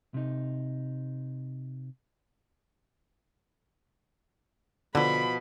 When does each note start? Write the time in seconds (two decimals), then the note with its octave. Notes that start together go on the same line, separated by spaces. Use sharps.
0.14 C3 D#4
4.95 B2 D3 F3 B5